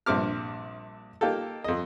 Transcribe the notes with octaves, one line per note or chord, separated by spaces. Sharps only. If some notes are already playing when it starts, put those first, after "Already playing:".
A#1 G2 C3 D6 F6
A#3 D#4 F4 G4 A4
F2 D#5